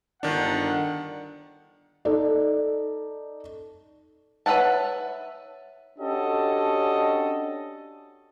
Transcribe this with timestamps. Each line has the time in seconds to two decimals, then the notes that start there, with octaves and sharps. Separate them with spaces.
0.23 G1 D#3 D4 A#4 F#5
2.05 D#4 A4 D5
4.46 B4 C#5 E5 F#5 A5
5.99 C#4 D4 F#4 G4 A4 D#5